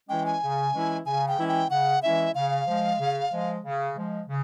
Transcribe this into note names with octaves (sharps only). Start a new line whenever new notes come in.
E3 G#3 C#4 E4 G5
G#5
C#3
E3 G#3 C#4 E4
C#3 G#5
G5
E3 G#3 C#4 E4
G5
C#3 F#5
E3 G#3 C#4 E4 E5
C#3 F5
F3 G#3
C#3
F3 G#3
C#3
F3 G#3
C#3